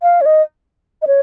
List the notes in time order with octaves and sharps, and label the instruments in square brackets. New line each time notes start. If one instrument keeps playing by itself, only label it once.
[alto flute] F5
C#5
D#5
D#5
C#5